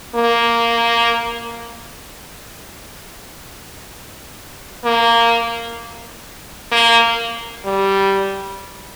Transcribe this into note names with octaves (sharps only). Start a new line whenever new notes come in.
A#3
A#3
A#3
G3